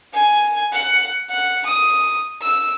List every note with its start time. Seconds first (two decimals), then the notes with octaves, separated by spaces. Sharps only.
0.13 G#5
0.72 F#5
1.30 F#5
1.66 D#6
2.42 E6